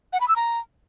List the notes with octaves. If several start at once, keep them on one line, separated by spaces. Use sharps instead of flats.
F#5
B5
E6
A#5